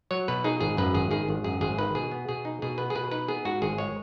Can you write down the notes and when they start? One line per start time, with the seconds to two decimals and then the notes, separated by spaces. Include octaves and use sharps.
0.11 F#3 C#5
0.28 B2 B4
0.44 D#4 G#4
0.60 G#1 G#4
0.77 F#2 B4
0.94 G#1 G#4
1.11 D#3 G#4
1.29 G#1
1.44 F#2 G#4
1.61 G#1 G#4
1.79 D#3 B4
1.95 B2 G#4
2.11 B3
2.29 B2 G#4
2.45 D#4
2.62 B2 G#4
2.78 B3 B4
2.90 G#4
2.95 B2 B4
3.11 D#4 B4
3.28 B3 G#4
3.45 G#2 F#4
3.62 G#1 G#4
3.78 G#3 C#5